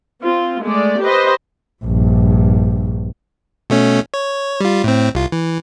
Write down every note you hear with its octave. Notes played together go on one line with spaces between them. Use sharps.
C4 F4
G#3 A3 D5
G4 B4 C5 D#5
A#1 G2
B2 A3 C#4
C#5
G3 F4
A2 C4
C2 F4
E3